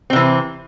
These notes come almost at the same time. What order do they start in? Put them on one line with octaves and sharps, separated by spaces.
C4 C3 E3